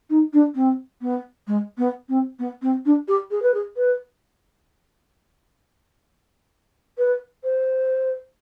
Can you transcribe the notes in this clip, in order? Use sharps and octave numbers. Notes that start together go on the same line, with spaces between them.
D#4
D4
C4
B3
G#3
B3
C4
B3
C4
D4
G4
G#4
B4
G#4
B4
B4
C5